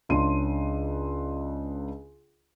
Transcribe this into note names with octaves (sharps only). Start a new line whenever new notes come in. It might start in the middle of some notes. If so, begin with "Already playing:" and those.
C#2 C#3 D4 C6 D#7